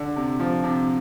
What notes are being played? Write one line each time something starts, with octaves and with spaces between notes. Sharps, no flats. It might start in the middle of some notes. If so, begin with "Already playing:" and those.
Already playing: D3
C3
F3
C3